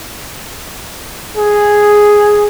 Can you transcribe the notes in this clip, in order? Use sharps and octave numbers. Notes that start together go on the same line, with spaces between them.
G#4